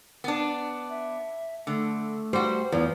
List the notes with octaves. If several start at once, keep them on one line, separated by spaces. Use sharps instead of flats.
B3 D4
E5
D3 A3
G3 F#4 C5
E2 F3 E4